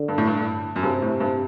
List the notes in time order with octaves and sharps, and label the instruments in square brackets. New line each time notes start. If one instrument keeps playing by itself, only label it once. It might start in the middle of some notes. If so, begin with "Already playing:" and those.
Already playing: [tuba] D3
[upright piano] G2
A2
G2
F#2
[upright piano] G2 [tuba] C3
[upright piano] A2
G2